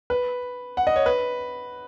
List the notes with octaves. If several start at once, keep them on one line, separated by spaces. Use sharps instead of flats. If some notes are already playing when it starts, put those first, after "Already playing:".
B4
F#5
D#5
C#5
B4